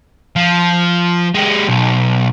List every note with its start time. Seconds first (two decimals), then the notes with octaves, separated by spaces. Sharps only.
0.36 F3
1.35 G#3 G4
1.69 B1